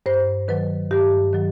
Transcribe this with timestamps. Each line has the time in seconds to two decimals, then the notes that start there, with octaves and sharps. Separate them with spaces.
0.06 G2 C5
0.48 D#3 F#3 B4
0.91 G2 G4
1.33 D#3 F#3